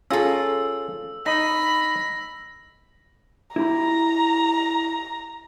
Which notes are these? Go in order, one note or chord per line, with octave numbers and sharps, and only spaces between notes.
C#4 F4 G#4 A4 A#5 E6
D#4 D#5 B5 A#6
E4 G4 A#5 B5